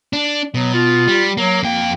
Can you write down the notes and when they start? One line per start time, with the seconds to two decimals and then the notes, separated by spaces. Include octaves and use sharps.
0.13 D4
0.54 B2 F#3
0.74 F4
1.08 G3
1.37 F#3 A#3
1.63 F2 A#3 G5